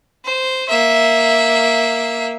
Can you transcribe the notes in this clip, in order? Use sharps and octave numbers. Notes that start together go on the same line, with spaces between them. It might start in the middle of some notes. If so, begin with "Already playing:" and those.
C5
A#3 E5